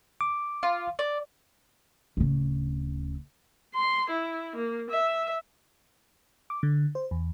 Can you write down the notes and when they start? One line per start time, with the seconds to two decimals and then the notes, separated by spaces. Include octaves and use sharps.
0.21 D6
0.63 F4
0.99 D5
2.17 D1 C#3
3.75 C6
4.10 E4
4.56 A#3
4.90 E5
6.50 D6
6.63 D3
6.95 C5
7.11 E2